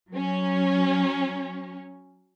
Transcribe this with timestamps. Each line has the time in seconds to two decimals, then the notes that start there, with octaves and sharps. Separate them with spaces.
0.11 F#3 C#4